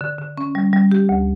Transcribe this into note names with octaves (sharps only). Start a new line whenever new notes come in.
D3
D3
C#4
G3
G3
G4
D2